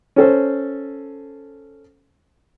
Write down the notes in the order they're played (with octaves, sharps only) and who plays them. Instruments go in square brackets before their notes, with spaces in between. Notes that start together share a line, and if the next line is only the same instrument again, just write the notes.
[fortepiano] C#4 A4 C5